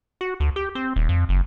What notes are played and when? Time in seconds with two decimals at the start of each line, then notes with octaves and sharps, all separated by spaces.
0.21 F#4
0.40 D2
0.56 G4
0.75 C4
0.96 D#1
1.09 F2
1.29 F#1